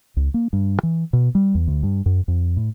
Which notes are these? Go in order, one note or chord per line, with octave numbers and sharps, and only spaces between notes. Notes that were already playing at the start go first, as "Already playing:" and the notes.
C#2
A#3
G2
E3
B2
G3
E2
D2
G2
F#2
F2
A2